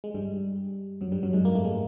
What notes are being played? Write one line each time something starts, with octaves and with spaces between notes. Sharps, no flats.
G#3
G2 G3
F#2 F#3
G2 G3
F#2 F#3
G#2 G#3
A#3
A3
G#3